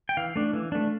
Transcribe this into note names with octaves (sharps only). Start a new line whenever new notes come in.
G5
E3 F5
A3 D4
E3
A3 D4